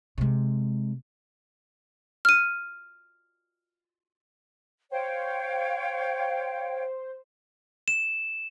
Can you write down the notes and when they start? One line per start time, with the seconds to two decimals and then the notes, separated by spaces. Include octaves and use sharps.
0.18 C3 G#3
2.25 F6 D#7
4.91 C5 C#5 F5 G5
7.88 E7